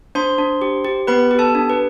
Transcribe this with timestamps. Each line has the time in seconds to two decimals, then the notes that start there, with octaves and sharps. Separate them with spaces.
0.15 D4 C5 C6
0.38 D4
0.62 G4
0.85 G4
1.07 B3 B4 B5
1.31 G4
1.38 A4 A5
1.55 D4
1.70 B4